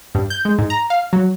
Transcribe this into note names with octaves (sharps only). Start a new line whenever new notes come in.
G2
G6
G#3
G#2
A#5
F5
F#3